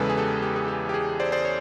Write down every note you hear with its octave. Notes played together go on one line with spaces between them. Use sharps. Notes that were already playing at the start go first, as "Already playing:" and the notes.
Already playing: E2 C#3 E3 G#3 A4 B4
G#4
G4 A4
G4
G#4
G4
G4
G#4
C5 D5
C5 D5
C#5